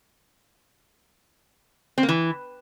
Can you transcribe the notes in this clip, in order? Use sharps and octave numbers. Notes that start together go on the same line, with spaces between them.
C4
A#3
E3